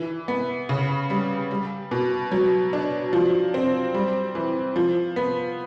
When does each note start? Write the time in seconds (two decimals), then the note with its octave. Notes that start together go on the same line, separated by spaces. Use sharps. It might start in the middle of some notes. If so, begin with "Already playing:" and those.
Already playing: E3
0.28 B3
0.69 C#3
1.10 G3
1.51 G3
1.91 B2
2.31 F#3
2.73 D4
3.13 F3
3.54 C4
3.94 G3
4.35 E3
4.76 F3
5.16 B3